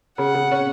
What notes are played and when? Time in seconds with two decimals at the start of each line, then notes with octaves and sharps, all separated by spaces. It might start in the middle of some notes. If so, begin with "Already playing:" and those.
0.18 C#3 F#5
0.34 C#3
0.51 C#4